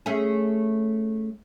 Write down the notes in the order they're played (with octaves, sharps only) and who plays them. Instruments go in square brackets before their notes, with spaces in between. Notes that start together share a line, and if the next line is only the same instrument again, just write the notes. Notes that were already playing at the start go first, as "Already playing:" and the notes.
[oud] A3 C#4 G#4